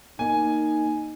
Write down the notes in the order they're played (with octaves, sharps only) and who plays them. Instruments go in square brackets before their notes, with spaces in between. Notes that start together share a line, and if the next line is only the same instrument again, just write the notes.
[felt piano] A#3 [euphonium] D#4 [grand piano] G#5